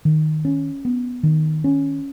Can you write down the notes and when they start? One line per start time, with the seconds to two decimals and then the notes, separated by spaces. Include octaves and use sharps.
0.05 D#3
0.45 C#4
0.85 B3
1.23 D#3
1.64 C#4